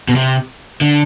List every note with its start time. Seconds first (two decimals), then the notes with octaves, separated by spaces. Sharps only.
0.09 B2
0.16 C3
0.81 D3